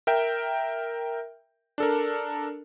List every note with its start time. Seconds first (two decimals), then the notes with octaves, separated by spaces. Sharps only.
0.07 A#4 E5 G5
1.78 D4 A4 A#4